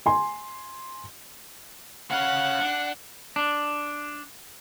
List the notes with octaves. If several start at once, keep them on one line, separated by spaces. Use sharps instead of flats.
G#5 C6
C#4 F5 F#5
D4
D4